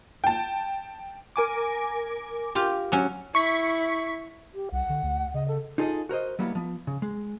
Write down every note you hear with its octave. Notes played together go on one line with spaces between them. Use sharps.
G5 A5
A#4 G#5 D6
F4 G4
F#3 C#4
E4 C#6 B6
G4
C2 F#5
D3
D2
C#3 D#5
A4
D#4 F4 G#4 A4 D5 D#5
F#4 A#4 C5 D#5
F#3 G3 A#3 B3 E4
F3 B3
C#3
G#3